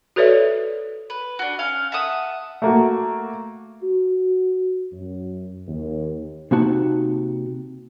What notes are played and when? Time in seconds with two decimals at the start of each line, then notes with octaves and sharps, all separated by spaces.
0.16 F#4 A4 B4 C#5 D5 E5
1.10 B4
1.39 D4 F#4
1.59 C#4 F5 F6
1.92 E5 F#5 A5 D#6
2.62 A3 A#3 F#4
3.83 F#4
4.92 F#2
5.68 D#2
6.51 C3 A#3 D#4 F#4 A5